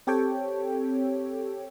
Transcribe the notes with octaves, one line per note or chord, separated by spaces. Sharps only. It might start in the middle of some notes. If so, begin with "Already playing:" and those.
C4 G4 A4 C#5 G5